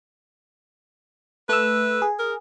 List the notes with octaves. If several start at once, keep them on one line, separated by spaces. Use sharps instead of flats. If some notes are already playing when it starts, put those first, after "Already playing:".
A3 B4 E6
G#4
A#4